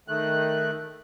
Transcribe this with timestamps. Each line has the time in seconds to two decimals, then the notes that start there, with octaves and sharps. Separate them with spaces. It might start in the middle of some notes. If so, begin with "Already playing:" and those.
0.08 D#3 A3 F#6